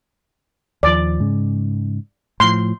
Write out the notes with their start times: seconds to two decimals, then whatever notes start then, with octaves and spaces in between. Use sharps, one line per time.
0.83 D#2 F3 D5
1.20 G#2 C#3
2.40 A2 F3 C6